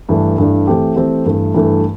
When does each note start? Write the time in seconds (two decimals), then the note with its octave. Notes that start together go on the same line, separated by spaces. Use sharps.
0.09 G2 E3 A3 D4
0.38 G2 E3 A3 D4
0.67 E3 A3 C4 G4
0.96 E3 A3 C4 G4
1.25 G2 E3 A3
1.54 G2 E3 A3